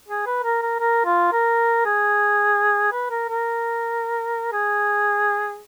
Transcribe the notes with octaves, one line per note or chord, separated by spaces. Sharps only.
G#4
B4
A#4
A#4
A#4
F4
A#4
G#4
B4
A#4
A#4
G#4